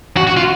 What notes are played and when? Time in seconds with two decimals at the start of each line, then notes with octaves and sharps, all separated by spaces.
0.17 F#4
0.27 F#4
0.37 F4